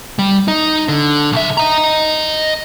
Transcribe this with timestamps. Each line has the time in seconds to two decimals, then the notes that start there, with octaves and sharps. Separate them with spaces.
0.19 G3
0.48 D#4
0.88 D3
1.32 B1 E5
1.57 D#5 A#5